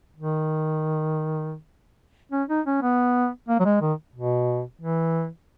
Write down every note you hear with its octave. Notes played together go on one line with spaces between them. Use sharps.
D#3
C#4
D#4
C#4
B3
A#3
F#3
G#3
D#3
B2
E3